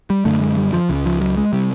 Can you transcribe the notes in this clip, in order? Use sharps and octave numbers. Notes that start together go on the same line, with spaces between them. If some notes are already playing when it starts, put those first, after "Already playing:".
G3
F#2 D3 A3
G#3
G3
F3
C#2 C#3
F3
F#3
G#3
C3 G3